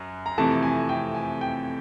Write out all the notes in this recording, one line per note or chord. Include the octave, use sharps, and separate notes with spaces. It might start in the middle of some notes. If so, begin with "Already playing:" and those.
Already playing: F#2 F#3
A#5
F2 C3 E3 A3 A5
G#5
G5
G#5
G5